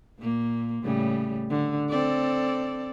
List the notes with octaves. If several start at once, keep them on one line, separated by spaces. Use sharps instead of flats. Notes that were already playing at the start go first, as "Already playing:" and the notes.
A#2 A#3
A2 C#3 G3
D3
C4 A4 D5